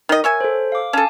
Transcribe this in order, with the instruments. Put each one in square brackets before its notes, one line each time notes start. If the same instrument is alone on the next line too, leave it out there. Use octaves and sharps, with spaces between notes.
[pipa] D#3 D#5 [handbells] A#4
[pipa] C#5 E5 G#5
[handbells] A4 C5
F5 D6
[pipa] C#4 A4 [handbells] G#5 A5